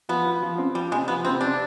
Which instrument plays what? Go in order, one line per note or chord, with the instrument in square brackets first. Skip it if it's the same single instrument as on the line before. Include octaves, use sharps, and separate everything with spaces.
[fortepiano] F3 [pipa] B3
[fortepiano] F3
F3
C4
[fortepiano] F3 [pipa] G3
[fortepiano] C3 [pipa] G#3
[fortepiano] F3 [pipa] B3
[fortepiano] C3 [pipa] C4
[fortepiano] C4 [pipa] D4